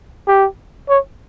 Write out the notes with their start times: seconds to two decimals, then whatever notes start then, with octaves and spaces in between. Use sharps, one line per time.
0.27 G4
0.89 C#5